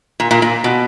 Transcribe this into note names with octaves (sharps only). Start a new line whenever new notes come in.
A#2
A#2
A#2
B2